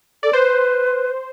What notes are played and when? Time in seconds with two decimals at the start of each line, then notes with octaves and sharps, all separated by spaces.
0.23 A4 D5
0.33 B4 C5